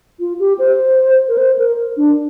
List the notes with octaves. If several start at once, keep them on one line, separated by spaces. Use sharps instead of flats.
F4
G4
C5
A#4
C5
A#4
D4